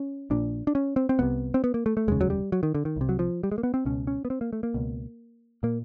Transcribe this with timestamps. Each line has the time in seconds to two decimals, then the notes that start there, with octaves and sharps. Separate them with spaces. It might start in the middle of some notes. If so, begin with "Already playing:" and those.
Already playing: C#4
0.30 A#1 A#2 D4
0.67 D4
0.75 C#4
0.96 C4
1.09 C4
1.19 C2 C3 B3
1.54 C4
1.64 B3
1.74 A#3
1.86 A3
1.97 A3
2.08 F1 D#2 C#3 G#3
2.21 F#3
2.30 G3
2.52 F#3
2.63 D#3
2.75 D3
2.85 D#3
2.96 C2 C3
3.09 F#3
3.19 F3
3.43 G3
3.52 G#3
3.58 A#3
3.63 B3
3.74 C4
3.85 C#2 B2 C#4
4.07 C#4
4.25 B3
4.30 C4
4.41 A#3
4.53 A3
4.63 A#3
4.74 C#2 B2
5.63 A#2 A#3